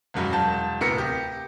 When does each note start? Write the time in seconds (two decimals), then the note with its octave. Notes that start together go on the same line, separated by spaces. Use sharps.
0.14 E1 F#2 F#3 G3
0.33 E1 A5 G6
0.81 D1 C3 B3 A#4 A#6 C#7
0.98 G4